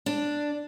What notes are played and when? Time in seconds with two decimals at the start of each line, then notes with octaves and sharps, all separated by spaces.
0.06 D4